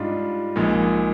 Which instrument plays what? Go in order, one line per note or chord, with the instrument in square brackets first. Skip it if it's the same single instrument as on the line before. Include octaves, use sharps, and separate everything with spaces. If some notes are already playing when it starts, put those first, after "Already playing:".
Already playing: [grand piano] G#2 G3 D4 F4
A#1 A#2 G#3 D#4